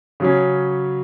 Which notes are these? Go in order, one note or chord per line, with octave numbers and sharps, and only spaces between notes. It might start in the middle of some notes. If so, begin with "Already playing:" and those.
C#3 F#3 C#4